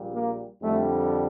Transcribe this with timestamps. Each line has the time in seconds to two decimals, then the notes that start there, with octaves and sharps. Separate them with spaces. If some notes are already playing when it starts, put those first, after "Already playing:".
Already playing: A#1 A#2 G3
0.13 A#3
0.63 F2 D3 G3 A3